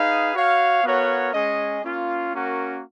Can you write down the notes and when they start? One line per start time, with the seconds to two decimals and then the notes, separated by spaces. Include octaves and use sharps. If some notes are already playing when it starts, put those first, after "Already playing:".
Already playing: D#4 G#4 B4 F5
0.34 F#4 C#5 F5
0.83 B3 F#4 A#4 C#5 F5
1.33 G#3 C#4 G#4 D#5
1.83 A#3 C#4 F4
2.33 A#3 C#4 F#4 A#4